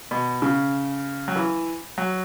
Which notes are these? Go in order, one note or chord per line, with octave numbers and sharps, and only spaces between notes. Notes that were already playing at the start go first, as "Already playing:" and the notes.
B2
C#3
F#3
E3
F#3